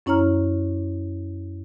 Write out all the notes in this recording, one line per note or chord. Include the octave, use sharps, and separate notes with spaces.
F#2 C#4 E4 C#5 A#5 F6